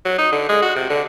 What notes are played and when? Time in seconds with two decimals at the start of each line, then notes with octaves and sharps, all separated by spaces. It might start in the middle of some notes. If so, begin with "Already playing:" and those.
0.05 F#3
0.18 D#4
0.32 D3
0.49 G#3
0.62 F#4
0.76 C3
0.90 D3